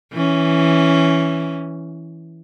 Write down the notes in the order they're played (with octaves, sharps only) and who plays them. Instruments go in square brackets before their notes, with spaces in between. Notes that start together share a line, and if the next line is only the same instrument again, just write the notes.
[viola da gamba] E3 C#4